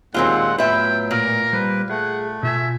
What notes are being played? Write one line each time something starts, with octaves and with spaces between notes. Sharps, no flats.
D#2 A#2 F#3 G#3 C4 F4 F#5
A2 F#3 B3 F4 B4 E5 G5
A#2 A#4
G3 A#3 B4 C5
A3 G#4 F#5
B2 F4 E5 G#5